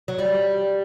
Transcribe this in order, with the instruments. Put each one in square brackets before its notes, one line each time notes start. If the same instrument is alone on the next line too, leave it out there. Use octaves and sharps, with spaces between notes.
[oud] F#3
G3